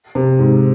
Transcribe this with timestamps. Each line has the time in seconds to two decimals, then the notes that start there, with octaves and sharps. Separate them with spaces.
0.15 C3
0.39 G#2